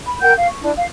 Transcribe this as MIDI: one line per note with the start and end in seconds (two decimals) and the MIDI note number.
0.07 0.20 83
0.21 0.32 70
0.21 0.32 78
0.21 0.32 79
0.21 0.32 91
0.36 0.48 77
0.48 0.61 85
0.62 0.72 62
0.62 0.72 64
0.76 0.86 77